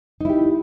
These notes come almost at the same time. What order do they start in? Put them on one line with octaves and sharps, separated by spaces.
D#4 E4 G4